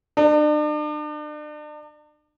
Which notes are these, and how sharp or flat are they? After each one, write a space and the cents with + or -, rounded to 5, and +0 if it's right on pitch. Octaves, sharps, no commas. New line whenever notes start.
D4 +40